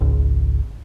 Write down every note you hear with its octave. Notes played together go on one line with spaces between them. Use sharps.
G#1 C#2